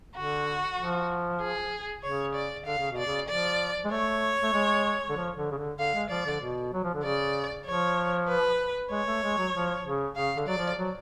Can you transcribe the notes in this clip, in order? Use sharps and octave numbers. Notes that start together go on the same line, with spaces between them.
D3 F#4
F3
G#4
C#3 C#5
D5
D3 F5
C#3
B2
D5
C#3
F3 D5
G#3
A3 C#5
A3
G#3
D3
F3
D3
C#3
D3
D3 F5
G#3
F3 D5
D3
B2
F#3
F3
D3
C#3 D5
F3 C#5
B4
G#3 C#5
A3
G#3
F#3
F3
C#3
C#3 F5
D3
F#3 D5
F3
F#3